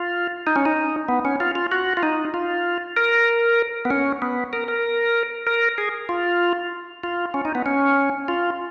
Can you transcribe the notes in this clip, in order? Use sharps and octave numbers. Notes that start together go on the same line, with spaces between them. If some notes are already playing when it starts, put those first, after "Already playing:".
Already playing: F4
D#4
C#4
D#4
B3
C#4
F4
F4
F#4
F4
D#4
F4
A#4
B3
C#4
B3
A#4
A#4
A#4
G#4
F4
F4
C#4
D#4
B3
C#4
F4